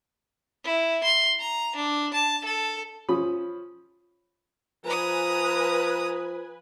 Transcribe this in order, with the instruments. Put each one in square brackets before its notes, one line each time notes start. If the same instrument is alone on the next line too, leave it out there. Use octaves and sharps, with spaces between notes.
[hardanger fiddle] E4
C6
A#5
D4
A5
A4
[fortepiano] F3 C#4 F4 B5 D#6
[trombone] F3 [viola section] B4 G#5 [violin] A#5 D#6